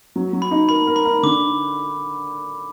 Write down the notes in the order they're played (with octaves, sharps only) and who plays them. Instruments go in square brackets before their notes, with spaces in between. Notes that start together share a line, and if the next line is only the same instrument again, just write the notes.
[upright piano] F#3
F#3
[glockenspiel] B5
[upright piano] D#4
[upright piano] A#4 [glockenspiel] B5
[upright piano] A#4
[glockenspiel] B5
[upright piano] A#4
[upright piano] D3 [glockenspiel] D6